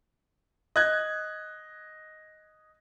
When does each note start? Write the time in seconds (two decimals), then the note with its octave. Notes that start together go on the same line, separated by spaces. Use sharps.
0.76 D#5 F#6 G#6